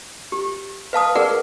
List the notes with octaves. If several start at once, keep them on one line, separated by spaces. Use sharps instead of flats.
G4
B4 F5 A5 D#6
G#4 A#4 B4 D5 F#5